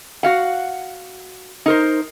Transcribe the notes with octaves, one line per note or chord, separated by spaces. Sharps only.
F#4 F5 F#5
D#4 A#4 C5